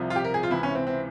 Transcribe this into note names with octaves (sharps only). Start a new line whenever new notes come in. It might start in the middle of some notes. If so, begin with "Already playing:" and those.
Already playing: C2 C3 F3
F4
G4
A#4
G#4
F4
C#2 C3 E3 E4
C#4
C4
C4